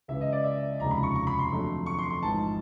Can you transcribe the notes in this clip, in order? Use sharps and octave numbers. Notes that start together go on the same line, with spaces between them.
C#2 C#3 E3 E5
D#5
D5
E5
F1 D#2 C#3 F3 G#3 A#5
B5
C#6
C#6
B5
C6
F2 D3 F#3 A3
C#6
C6
C6
A1 G#2 F3 A5